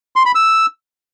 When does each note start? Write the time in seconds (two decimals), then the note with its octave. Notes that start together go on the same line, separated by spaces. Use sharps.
0.16 C6
0.25 B5
0.35 E6